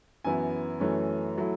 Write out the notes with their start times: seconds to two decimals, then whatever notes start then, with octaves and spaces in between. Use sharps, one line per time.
0.24 F#2 E3 B3 E4 G#5
0.80 F#2 E3 A3 C#4
1.38 F#3 A3 E4